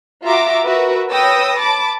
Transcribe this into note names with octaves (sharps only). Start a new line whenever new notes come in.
F4 F#4 E5 F5 A#5 D6
F#4 A#4 B4 E5
B4 C#5 G5 D#6 E6 A#6
A5 B5 D6